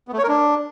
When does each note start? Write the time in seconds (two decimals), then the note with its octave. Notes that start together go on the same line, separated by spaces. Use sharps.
0.08 B3
0.13 A3
0.18 C#5
0.23 A#4
0.28 D4